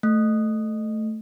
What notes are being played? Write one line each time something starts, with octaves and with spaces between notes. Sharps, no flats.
A3